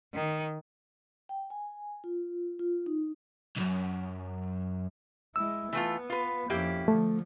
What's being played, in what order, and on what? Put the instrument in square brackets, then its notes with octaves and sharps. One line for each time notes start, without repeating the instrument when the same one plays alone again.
[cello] D#3
[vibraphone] G5
G#5
F4
F4
D#4
[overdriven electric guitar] C2 F#2
[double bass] G#3 E4 [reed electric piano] E6
[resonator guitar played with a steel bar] E3 A3 F4 [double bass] B3
[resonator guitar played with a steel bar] F4 B4
[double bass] F2 C#4 [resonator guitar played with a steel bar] A#3 E4 G4
[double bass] D3 F3 [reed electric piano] A3